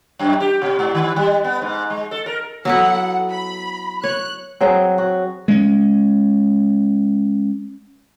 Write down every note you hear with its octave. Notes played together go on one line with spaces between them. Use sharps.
F#2
G4
B2
G#2
D#3
G3
B3
G#2
G#3
A4
A#4
F#3 B3 E4 A4 F#5
B5
C#5 F#6
F#3 C4 G#4
F#4
G#3 C#4